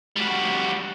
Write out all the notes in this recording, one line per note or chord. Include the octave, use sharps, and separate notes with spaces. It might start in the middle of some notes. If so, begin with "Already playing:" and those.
G3 F#4